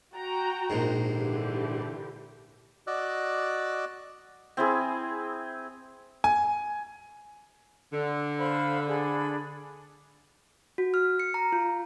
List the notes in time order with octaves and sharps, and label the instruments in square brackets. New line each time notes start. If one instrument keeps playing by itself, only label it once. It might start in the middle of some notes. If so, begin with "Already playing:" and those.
[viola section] F#4 G5 A#5
[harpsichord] A#1 G#2
[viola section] D3 E3 G4
[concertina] F#4 D5 D#5 D6 E6 F#6
[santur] C4 E4 G#4
[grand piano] G#5
[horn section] D3
[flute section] C5 F5 B5
D4 G#4 B5
[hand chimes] F#4
F6
C#7
A#5
F4